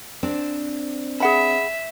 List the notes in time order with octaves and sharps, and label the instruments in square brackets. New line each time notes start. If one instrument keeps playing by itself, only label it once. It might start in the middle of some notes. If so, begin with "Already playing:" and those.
[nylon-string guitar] C4 D4
[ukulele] G#4 F#5 B5 [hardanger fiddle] E5